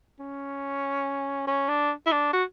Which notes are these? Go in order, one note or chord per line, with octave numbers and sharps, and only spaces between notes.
C#4
C#4
D4
E4
D4
F#4